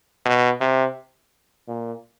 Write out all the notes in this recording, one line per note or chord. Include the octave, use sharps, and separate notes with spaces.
B2
C3
A#2